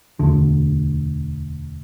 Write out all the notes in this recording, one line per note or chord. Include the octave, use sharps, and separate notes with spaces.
E1 D2 D3